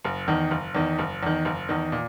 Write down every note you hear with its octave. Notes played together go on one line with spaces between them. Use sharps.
F#1
E2 D#3
F#1
E2 D#3
F#1
E2 D#3
F#1
E2 D#3
A#2